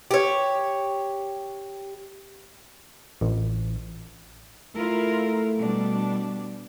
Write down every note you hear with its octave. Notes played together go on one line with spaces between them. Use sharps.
G4 C#5
A1
A3 E4 F4 A#4
B2 G3 D4